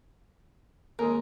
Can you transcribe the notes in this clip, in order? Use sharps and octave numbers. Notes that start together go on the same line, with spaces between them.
D#2 G#3 G#4 A#4